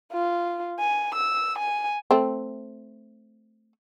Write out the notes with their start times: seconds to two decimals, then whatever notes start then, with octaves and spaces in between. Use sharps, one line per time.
0.13 F4
0.79 G#5
1.15 E6
1.58 G#5
2.11 A3 C4